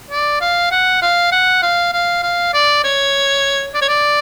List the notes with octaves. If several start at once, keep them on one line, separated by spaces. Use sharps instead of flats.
D5
F5
F#5
F5
F#5
F5
F5
F5
D5
C#5
D5
C#5
D5